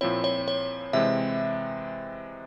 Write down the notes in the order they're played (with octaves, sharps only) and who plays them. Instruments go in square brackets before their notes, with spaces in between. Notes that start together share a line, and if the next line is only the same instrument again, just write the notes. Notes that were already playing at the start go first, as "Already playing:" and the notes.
[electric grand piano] A#2 F3 C4 E4 [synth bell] C#5
[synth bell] C#5
C#5
[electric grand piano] C3 E3 G#3 C4 [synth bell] E5